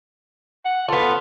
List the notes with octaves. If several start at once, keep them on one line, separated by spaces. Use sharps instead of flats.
F#5
B3 F4 A4